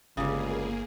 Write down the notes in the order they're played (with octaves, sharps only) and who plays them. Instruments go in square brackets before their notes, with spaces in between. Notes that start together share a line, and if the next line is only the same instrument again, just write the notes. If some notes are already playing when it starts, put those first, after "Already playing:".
[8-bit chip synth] G1 [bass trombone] C#2 [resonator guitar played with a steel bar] C#3 G3 [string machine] A#3 G#4